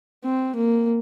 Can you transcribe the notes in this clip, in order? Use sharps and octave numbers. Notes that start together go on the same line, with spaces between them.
C4
A#3